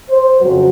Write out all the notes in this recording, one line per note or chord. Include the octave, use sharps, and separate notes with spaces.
C5
F2 C#3 F#3 F#4